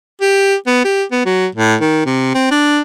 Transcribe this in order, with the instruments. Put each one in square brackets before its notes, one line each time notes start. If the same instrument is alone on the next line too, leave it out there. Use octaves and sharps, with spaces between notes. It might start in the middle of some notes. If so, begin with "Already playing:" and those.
[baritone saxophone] G4
B3
G4
B3
F#3
A2
D#3
C3
C4
D4